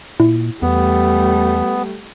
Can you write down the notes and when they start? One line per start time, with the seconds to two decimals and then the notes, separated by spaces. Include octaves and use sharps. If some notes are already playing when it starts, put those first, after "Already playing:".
0.20 A#2 E4
0.62 E2 G3 A3 B3